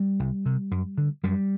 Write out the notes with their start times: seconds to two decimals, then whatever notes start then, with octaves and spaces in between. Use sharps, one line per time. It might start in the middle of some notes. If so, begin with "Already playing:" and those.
Already playing: G3
0.19 C2
0.46 C3
0.71 F#2
0.98 D3
1.23 F#2 G3